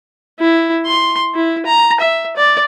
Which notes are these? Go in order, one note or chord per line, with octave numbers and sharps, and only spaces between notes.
E4
C6
E4
A#5
E5
D5